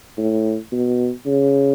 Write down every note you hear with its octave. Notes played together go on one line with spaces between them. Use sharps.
A2
B2
C#3